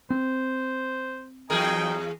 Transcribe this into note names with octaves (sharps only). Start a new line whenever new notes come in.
C4 C5
E2 F#3 D#4 G#4 A#4 G5